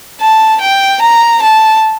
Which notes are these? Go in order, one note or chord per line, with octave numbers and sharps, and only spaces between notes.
A5
G5
A#5
A5